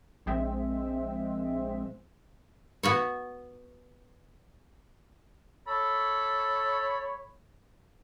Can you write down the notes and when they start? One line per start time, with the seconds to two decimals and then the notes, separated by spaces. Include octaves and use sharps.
0.26 A#1 G#3 C4 E5
2.83 B3 F#4 C#5
5.68 A4 C#5 B5